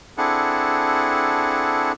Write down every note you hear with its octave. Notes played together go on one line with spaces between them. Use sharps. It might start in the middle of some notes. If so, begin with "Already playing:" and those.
C4 D4 E4 G#4 A4 F#5